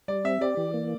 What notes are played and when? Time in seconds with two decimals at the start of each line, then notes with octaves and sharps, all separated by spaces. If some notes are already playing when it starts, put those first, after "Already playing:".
0.08 G3 D5
0.24 C4 E5
0.41 G4 D5
0.57 E3
0.74 A#3